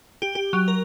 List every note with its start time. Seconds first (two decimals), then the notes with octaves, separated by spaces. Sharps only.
0.22 G4
0.35 G4
0.53 F#3
0.68 A#4